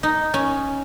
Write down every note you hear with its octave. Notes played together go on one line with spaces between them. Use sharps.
D#4
C#4